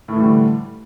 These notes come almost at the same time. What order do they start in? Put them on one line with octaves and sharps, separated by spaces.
A2 A3 E3 G3 D3